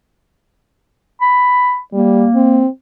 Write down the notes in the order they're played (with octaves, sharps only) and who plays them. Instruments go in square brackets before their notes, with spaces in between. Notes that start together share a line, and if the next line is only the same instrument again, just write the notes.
[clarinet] B5
[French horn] G3 [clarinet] A#3
[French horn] C4